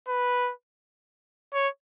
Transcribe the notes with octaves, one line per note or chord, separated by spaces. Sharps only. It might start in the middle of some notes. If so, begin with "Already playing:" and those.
B4
C#5